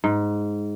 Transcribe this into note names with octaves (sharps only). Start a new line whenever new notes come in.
G#2